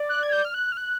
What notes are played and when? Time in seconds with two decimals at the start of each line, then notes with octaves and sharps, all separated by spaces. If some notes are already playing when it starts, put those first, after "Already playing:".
Already playing: D5
0.09 F#6
0.23 G#6
0.32 G6
0.45 F6
0.54 F#6
0.72 F6
0.77 F#6